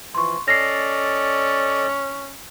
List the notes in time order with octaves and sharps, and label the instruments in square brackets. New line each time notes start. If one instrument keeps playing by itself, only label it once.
[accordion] E3 F3 [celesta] C6 C#6
[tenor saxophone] C#4 [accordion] A4 D5 D#5 [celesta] A#6 C7